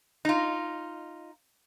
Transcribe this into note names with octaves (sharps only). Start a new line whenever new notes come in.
D#4 F4